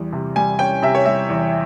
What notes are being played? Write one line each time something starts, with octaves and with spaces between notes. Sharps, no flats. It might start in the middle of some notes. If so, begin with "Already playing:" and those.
Already playing: E2 G3
C3
G3 G#5
C#4 G5
C3 E5
C#5
G3 E5
E2